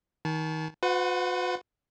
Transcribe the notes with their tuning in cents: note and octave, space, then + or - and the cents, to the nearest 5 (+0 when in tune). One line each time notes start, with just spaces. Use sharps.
D#3 +25 A5 -35
F#4 -45 B4 +35 F#5 +0